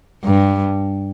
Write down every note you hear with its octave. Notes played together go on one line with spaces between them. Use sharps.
G2